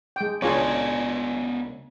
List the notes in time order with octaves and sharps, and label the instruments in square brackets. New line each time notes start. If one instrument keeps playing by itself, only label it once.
[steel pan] G#3 G5
[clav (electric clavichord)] C#2 D4 [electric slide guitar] B3 A#4 G#5 [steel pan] F4 G#4 C#5